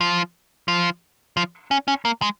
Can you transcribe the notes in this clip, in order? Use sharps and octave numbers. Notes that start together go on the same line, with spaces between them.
F3
F3
F3
C#4
C#4
A#3
G#3